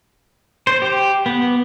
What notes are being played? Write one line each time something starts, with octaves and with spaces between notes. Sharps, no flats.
C5
G4
B3